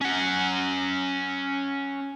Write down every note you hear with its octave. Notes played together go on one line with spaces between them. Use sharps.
C#4 F#5